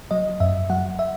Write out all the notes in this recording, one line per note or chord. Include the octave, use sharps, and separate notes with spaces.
F#3 D#5
F#2 E5
F#3 F#5
E5